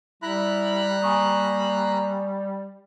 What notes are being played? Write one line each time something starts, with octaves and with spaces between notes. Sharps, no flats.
G3 E4 A#5 B5 F#6
A#3 G#5 C#6 D#6